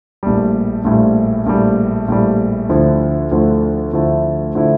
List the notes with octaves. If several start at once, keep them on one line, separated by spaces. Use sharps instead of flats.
A#1 A2 G3
A#1 A2 G3
A#1 A2 G3
A#1 A2 G3
D2 D3 F3 A3 E4
D2 D3 F3 A3 E4
D2 D3 F3 A3 E4
D3 F3 A3 E4